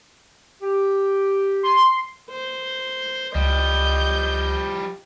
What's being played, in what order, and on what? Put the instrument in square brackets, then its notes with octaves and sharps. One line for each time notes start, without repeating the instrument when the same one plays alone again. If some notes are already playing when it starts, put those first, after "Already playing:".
[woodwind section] G4
[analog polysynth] C6
[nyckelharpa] C5
[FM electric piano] C#2 [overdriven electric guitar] F3 G3 [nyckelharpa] D#5 [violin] G6